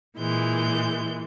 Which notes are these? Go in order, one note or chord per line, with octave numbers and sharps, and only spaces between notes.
A#2 E3 G#3 G6